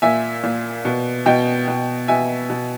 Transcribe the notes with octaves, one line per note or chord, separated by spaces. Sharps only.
A#2 E5 G#5
A#2
B2
B2 D#5 G5
B2
B2 E5 G#5
B2